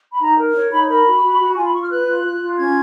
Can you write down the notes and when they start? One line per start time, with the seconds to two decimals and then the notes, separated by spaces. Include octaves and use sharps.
0.11 B5
0.21 D#4 A#5
0.38 A#4
0.54 C#5
0.71 D#4 B5
0.88 A#4 B5
1.05 F#4
1.22 F#4
1.39 F#4
1.56 F4 G#5
1.65 B5
1.73 F4 C#6
1.81 F6
1.90 B4 F#6
2.07 F4
2.24 F4
2.40 F4
2.58 C#4 G#6